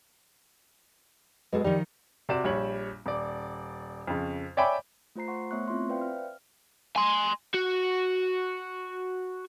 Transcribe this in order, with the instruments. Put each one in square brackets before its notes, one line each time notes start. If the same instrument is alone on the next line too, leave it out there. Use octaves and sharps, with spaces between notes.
[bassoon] B2 [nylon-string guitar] G#3 G#4 A4
[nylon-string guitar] D#3 F3 D#4 [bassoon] G3
[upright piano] C3 F#4 D5 E7
A#1 G3 C#5 F#7
D#1 D5
F2 C#3
C#5 D5 E5 G5 G#5 B5
[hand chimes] A3 F4 C5 A#5 C7
C5 F#5 C6 C#6
A3 B3 C#5 E5 C#6 F#6
C4 E4 F4 E5 C6
B4 C5 D5 E5 F5 G5
F6
[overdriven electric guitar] G#5 C6
F#4